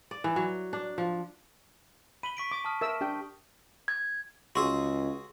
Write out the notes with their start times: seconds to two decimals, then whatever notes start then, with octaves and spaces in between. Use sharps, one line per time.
0.11 D5
0.24 E3
0.36 F#3
0.73 D4
0.98 F3
2.23 B5 D#7 F#7 G7
2.37 C#6 B6 D7
2.51 D6
2.65 A5 D#6 F6
2.81 A#4 E5 E6
3.01 D4 G4 G5
3.88 G#6
4.55 C#2 F#4 G#4 C6 C#6 E6